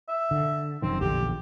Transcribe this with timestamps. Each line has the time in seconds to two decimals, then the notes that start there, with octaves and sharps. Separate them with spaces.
0.09 E5
0.31 D3
0.82 F1 F#2 D#3 C4
1.01 A#1 E2 D3 G4